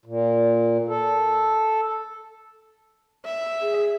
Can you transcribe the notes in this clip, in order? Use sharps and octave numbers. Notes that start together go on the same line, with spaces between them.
A#2
A4
E5
G#4